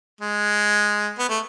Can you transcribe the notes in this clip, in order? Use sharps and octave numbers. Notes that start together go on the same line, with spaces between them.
G#3
B3
A3